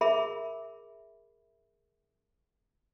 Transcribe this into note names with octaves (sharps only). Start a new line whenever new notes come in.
G#4 A#4 E5 B5